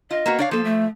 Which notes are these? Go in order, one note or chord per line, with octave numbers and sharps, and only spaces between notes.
F4 D#5
A#3 B3 F#4
D4 C#5 F5
F3 A#3 A4
A3